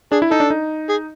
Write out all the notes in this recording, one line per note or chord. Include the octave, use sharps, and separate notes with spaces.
D4 G#4
E4
D#4 A4
D4
D#4
G#4